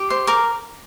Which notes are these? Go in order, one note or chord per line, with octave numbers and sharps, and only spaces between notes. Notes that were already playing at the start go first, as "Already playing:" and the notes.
Already playing: G4
C5
A#4 D6